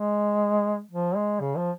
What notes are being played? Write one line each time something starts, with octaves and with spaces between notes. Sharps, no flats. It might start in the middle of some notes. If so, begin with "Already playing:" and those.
Already playing: G#3
F3
G#3
C#3
F3